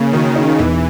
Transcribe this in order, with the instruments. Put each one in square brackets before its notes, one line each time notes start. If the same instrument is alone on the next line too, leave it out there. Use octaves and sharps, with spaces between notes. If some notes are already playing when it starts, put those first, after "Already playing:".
Already playing: [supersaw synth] C#3 [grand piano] A#3
[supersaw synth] D#3 [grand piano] F#4
[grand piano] D#4
[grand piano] E1 [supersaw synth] E3